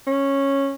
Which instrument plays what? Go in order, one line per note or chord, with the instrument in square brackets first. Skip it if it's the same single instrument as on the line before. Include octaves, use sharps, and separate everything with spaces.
[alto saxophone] C#4